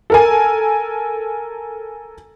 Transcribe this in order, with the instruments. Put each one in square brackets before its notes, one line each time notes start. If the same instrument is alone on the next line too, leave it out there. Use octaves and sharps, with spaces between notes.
[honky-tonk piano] A4 A#4 G#5